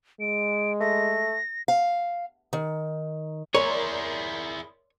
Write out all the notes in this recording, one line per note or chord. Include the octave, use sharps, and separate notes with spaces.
G#3 D7
A3 A#6
F5
D#3
E4 G#4 A#4 C#5 D5 C6